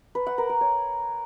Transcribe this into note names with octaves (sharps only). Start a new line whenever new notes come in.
B4
F#5
A#4
A#4
C#5